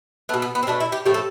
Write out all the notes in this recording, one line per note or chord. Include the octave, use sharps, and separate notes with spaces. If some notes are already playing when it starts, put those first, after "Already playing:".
B2 A3 B3
B3
B3
C4
B2 A3 D4
E4
G4
A2 F3 A3 G4
A4